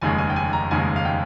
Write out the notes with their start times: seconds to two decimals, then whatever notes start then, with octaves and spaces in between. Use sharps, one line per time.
0.01 F1 D#2 C#3 G#3 G#5
0.18 G#5
0.30 G5
0.36 G#5
0.53 A#5
0.70 F1 D#2 C#3 G#3 G#5
0.96 F5
1.05 G5